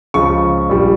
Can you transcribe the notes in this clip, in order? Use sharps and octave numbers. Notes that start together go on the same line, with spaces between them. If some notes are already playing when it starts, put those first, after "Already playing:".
C#2 C#3 F3 C#6
A#1 A#2 G3